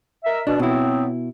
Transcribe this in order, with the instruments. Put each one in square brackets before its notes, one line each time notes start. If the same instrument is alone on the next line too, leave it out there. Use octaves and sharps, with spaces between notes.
[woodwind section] A#4 D#5 E5
[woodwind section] B2 [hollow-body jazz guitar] D4
[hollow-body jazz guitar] B2 E4 [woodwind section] F#3 B3 C4